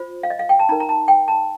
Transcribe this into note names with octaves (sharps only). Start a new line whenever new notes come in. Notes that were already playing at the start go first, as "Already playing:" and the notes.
Already playing: F4 C5
F5
D#5
F5
G5
A5
D#4 A#4 A#5
A#5
A5
G5
A5